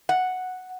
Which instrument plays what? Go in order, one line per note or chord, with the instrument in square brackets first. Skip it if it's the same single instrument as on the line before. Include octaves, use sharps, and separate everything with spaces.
[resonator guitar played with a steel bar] F#5